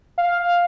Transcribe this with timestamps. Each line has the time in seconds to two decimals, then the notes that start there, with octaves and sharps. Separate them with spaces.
0.18 F5